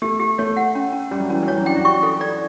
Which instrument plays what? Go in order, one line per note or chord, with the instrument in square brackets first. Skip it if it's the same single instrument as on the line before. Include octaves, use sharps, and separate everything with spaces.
[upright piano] A3 [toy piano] G4
[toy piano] G4
[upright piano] A3 [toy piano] C#5
[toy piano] F#5
C#4
C#4
[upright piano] G3 [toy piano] C#4
[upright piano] F#3
[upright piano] E3 [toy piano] C#4
[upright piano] F#3
[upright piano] E3 [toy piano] C#5
[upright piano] F#3
[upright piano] D4 [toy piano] G5
[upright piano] F#4
[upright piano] G4 [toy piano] C#6
[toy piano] A4
D5